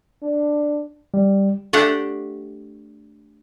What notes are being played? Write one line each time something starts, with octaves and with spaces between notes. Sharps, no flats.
D4
G3
A3 D4 G4 F#5